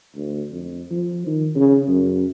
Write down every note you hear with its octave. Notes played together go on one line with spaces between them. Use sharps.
D2
F2
F3
D#3
C#3
F#2